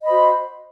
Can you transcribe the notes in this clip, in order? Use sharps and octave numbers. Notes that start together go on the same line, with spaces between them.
F#4 C5 D#5 B5